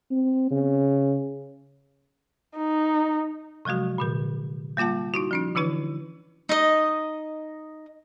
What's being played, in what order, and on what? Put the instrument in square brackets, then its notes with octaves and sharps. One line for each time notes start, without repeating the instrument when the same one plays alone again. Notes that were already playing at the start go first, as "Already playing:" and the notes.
[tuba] C4
C#3
[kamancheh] D#4
[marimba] C3 F3 F#3 G#3 F#4
A#2 D3 A#4
G3 A#3 F4 F#5 A5
D#4 E4 F#4
F3 C#4 D#4
D3 E3 D4 E4 B4
[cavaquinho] D#4 D#5